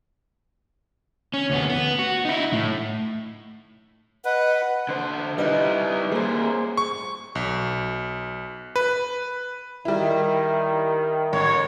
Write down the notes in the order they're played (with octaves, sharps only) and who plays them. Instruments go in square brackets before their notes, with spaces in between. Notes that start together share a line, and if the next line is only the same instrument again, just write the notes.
[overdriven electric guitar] C#4
D2 B3
B3
F#4
D#4 E4
A2
[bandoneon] B4 [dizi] D#5 [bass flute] F#5
[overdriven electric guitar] D3 C5
[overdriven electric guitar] G3 E4 [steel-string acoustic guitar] D#4 B4 D#5
[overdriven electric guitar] G3 A#3 [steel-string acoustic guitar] G#4 C5
[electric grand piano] C#6
B1
B4
[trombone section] D#3 [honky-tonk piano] G3 E4
[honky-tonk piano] A1 [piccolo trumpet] C#5